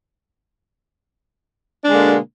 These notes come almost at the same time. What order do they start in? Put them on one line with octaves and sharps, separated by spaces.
D4 G#3 D3 A#3 B2